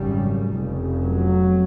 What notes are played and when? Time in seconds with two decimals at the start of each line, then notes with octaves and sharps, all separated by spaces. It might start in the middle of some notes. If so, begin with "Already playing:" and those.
Already playing: G#1 F#2 C#3 G3
0.49 F1 F2 C#3
1.04 F#3